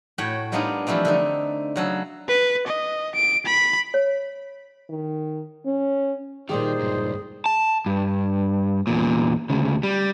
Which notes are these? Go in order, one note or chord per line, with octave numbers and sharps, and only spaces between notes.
A2 F#4 C#5 G5 B5
G3 A#3 B3 D4 D#4 F4
E3 F3 G3 A3 C4
D3 A3 D#4
C#3 F#3 A4
B4
D#5
D7
B5
C#5
D#3
C#4
A#2 D#3 G3 D#4 G4 G#4 C5
C#2 G2
A5
G2
E2 A#2
D2 C#3
G3